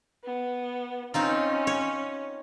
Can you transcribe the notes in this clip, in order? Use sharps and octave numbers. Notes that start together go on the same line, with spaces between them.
B3
C4 C#4 D#4 F4
C#5